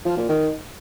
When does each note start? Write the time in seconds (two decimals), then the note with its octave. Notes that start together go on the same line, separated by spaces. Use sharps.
0.06 F3
0.17 A#2
0.29 D#3